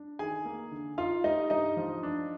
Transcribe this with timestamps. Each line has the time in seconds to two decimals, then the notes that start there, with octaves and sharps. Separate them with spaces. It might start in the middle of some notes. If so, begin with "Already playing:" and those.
Already playing: D4
0.19 D#3 G#4 G#5
0.45 A#3
0.72 D3
0.98 D#4 F4 F5
1.24 G3 D#4 D#5
1.50 G2 D#4 D#5
1.77 F3
2.03 D4